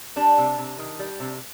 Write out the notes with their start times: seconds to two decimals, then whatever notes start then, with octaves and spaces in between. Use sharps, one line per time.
0.16 G3 D4
0.38 C3
0.58 C3
0.79 D#3
1.00 G3
1.20 C3